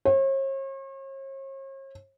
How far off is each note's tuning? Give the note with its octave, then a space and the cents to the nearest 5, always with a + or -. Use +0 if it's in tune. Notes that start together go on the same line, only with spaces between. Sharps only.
C#5 -45